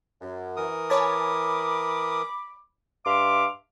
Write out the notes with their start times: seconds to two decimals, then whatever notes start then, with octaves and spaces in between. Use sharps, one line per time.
0.22 F#2
0.56 E3 A#4 D#6
0.90 C#5 G#5 A5 B5 D6
3.06 G2 E5 F5 C6 D6